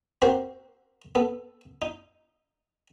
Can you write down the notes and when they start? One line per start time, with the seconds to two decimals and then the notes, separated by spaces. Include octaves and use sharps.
0.22 C4 F#4 G4 A#4 C5
1.15 B3 A4
1.82 D#4